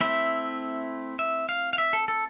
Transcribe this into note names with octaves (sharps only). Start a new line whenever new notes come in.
A3 C4 E4 E5
E5
F5
F5
E5
A4
A4